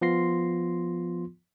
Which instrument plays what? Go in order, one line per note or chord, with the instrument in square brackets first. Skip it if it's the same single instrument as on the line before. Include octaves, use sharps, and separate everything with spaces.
[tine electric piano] F3 B3 F4 C6 A#6 C7